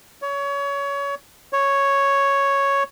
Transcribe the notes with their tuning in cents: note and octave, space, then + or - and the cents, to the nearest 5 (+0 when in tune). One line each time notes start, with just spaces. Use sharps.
C#5 +25
C#5 +0